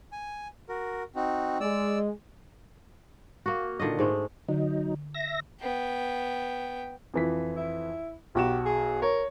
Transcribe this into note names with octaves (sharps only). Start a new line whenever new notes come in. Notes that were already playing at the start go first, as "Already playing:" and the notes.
G#5
F#4 A#4
C4 D#4 F#4
G#3 D5 E6
A#3 F#4
A#2 D3 D#3 D#5
G#2 G#3 A3
D3 F#3 D#4
E5 A#6
B3 G5
F2 E3 B6
E4
B1 F#4 G4 E7
G#4
A#4 C#5